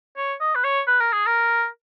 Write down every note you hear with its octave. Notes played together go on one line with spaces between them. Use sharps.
C#5
D#5
B4
C#5
B4
A#4
G#4
A#4